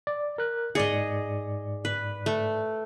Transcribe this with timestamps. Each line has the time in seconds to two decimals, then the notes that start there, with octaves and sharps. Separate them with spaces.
0.07 D5
0.38 A#4 F#6
0.75 G#2 G#4 D5 D#5 C#7
1.85 B4
2.26 A3